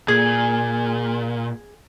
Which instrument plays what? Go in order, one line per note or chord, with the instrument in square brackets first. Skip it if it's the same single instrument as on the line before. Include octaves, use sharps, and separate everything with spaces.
[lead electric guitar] A#2 [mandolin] G#4